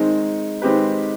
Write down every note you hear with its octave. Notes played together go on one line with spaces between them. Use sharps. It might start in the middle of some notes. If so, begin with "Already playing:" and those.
Already playing: D#3 G#3 C4 D#4
D#3 G#3 C4 G4 B4